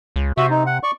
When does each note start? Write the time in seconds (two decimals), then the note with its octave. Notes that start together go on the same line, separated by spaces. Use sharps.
0.16 C#2
0.37 C3 F#4 E5
0.50 D#4
0.66 F#5
0.83 D5 C#6